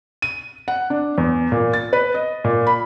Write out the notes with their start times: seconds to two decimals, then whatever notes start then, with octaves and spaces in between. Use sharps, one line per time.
0.22 D#7
0.68 F#5
0.90 D4
1.18 E2
1.52 A#2
1.73 A6
1.93 B4
2.14 D#5
2.44 A#2
2.67 B5